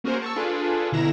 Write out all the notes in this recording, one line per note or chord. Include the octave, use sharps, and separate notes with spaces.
A#3 C#4 F#4 G#4 A#4 C5
A5 C#6 E6
D4 F4 G#4 A4 B4
B2 D3 E4 A#5 A#6 E7